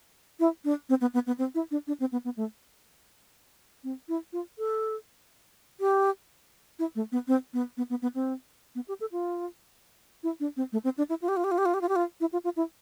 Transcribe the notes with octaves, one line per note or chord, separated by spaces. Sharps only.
E4
D4
C4
B3
B3
B3
C4
E4
D4
D4
C4
B3
B3
A3
C4
E4
F4
A4
G4
E4
A3
B3
C4
B3
B3
B3
B3
C4
B3
G4
A4
F4
E4
D4
C4
A3
C4
D4
E4
F4
G4
F4
G4
F4
G4
F4
G4
F4
G4
F4
E4
F4
F4
E4